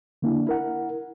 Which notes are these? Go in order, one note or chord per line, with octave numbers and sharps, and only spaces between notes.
D3 A#3 D4 E4
E4 A#4 F#5